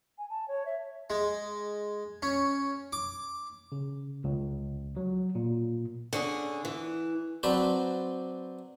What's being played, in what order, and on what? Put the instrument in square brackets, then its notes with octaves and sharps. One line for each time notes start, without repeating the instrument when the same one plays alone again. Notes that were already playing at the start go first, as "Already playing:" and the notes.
[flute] G#5
A5
C#5
E5
[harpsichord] G#3
C#4
D6
[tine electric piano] C#3
C#2
F#3
A#2
[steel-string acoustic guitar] D3 C#4 G#4
E3
[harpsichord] F#3 C4 D4 B4 C5